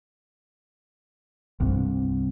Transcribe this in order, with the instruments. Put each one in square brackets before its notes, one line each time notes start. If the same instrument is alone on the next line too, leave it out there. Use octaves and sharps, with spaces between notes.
[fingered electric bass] C2 G2 C3